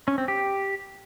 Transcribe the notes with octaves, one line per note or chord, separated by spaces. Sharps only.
C#4
C4
G4